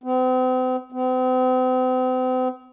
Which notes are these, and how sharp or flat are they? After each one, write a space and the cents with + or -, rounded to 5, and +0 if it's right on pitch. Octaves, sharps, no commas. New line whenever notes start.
C4 -40
C4 -40